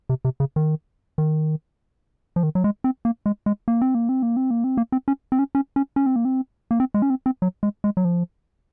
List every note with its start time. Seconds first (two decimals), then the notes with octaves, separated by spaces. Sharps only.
0.09 C3
0.25 C3
0.40 C#3
0.56 D#3
1.18 D#3
2.36 F3
2.43 D#3
2.55 F#3
2.64 G#3
2.84 C4
3.05 A#3
3.26 G#3
3.46 G#3
3.68 A#3
3.81 C4
3.95 A#3
4.09 C4
4.23 A#3
4.37 C4
4.51 A#3
4.64 C4
4.77 A#3
4.92 C4
5.08 C#4
5.32 C4
5.39 C#4
5.55 C#4
5.76 C#4
5.96 C#4
6.06 C4
6.16 A#3
6.25 C4
6.71 A#3
6.80 C4
6.94 G#3
7.02 C#4
7.10 C4
7.26 C4
7.42 F#3
7.63 G#3
7.84 G#3
7.97 F#3
8.05 F3